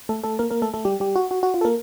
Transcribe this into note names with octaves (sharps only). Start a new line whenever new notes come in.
A3 A4
A3 A4
A#3 A#4
A#3 A#4
A3 A4
A3 A4
G3 G4
G3 G4
F#4
F#4
F#4
F4
A4
A#3 A#4